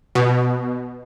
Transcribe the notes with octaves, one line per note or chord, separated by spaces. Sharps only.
B2